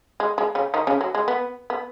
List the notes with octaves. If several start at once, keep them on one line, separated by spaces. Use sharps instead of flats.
G#3
G#3
C#3 C#4
D#3 D#4
C#3 C#4
F#3
G#3
B3
B3